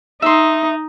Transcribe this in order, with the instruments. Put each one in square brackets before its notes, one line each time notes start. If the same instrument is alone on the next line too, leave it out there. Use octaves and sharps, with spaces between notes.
[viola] D#4 [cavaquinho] E5 C6